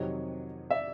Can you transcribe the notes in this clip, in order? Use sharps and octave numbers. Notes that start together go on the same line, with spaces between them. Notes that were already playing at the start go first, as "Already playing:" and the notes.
Already playing: F2 C3 D#3 F#3 C#5 D#5
D5 E5